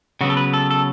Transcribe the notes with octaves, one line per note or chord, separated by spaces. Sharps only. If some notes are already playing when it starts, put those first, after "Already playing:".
C#3 F#3 B3 F#4
A4
B4
A4
A4